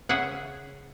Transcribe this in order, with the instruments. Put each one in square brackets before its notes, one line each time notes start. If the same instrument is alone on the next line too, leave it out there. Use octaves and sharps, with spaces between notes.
[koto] C#3 G#4 E5 F#5